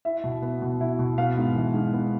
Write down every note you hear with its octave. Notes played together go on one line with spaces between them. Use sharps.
E4 E5
B2
B3
B2
E4
B2
B3 F5
G#2
E3
G#2
B3